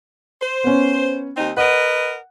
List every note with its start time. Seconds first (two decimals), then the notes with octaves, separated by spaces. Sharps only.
0.41 C5
0.64 B3 C#4
1.35 D#2 C4 D#4
1.57 A#4 B4 D#5 F#5